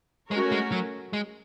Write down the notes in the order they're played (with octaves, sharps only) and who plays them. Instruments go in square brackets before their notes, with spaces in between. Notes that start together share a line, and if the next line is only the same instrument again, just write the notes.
[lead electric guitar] G#3 [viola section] A3 C#4 F#4 A#4 C#5
[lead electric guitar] G#3
F#3
G#3